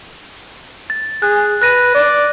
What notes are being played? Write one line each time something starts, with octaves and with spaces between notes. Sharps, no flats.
A6
G#4 F#6
B4 F#6 A#6 D#7
D5